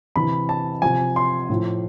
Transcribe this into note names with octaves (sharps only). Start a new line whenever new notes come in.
C3 E3 B5
A5
C3 F3 G#5
C6
A2 F3